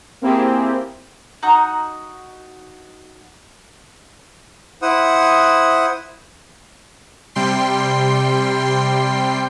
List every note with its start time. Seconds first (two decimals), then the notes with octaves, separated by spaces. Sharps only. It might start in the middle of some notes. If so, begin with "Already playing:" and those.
0.21 A#3 C4 E4 G4 G#4
1.43 D#4 F#4 A#5 D#6
4.82 E4 C5 F#5 D#6
7.35 C3 G3 G5 C6 C7